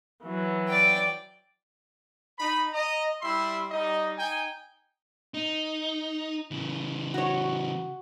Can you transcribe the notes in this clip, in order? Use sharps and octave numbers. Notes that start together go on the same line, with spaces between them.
E3 F#3
D5 G5
D#4 B5
D#5 A#5
G3 E4 E5 C6
G3 D#4 D#5
D#4 G5 G#5
D#4
C#3 E3
F#4 C#5